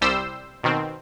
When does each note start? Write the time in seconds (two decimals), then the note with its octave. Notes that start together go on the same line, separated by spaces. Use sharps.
0.01 C2 G3 C5 E6
0.64 B2 D#3 C4